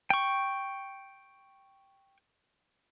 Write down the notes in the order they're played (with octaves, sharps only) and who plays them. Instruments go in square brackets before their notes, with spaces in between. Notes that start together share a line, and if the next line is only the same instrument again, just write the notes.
[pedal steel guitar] G5 C#6